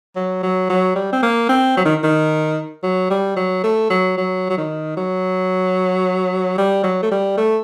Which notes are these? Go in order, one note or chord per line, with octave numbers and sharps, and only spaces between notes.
F#3
F#3
F#3
G3
C4
A#3
C4
F#3
D#3
D#3
F#3
G3
F#3
A3
F#3
F#3
F#3
D#3
F#3
G3
F#3
A3
G3
A3